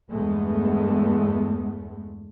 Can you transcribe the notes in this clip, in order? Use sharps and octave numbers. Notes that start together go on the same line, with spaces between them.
E2 G2 G#3 A3 B3